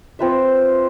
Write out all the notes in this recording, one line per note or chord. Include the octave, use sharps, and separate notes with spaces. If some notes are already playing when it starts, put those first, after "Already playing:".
C4 F4 B4 E5